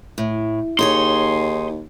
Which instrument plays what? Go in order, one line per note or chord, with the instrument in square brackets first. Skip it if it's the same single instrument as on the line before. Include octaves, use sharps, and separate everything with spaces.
[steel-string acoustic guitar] A2
[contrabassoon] D#2 [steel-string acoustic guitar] D#4 G#4 C#5 [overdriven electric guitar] C6